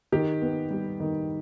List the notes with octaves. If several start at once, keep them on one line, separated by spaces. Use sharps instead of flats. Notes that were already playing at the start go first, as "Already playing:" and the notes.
D#3 G4
B3
G3
D#3